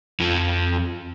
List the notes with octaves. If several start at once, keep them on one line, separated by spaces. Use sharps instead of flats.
F2 F3